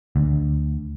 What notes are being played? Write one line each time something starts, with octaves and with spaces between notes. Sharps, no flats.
D2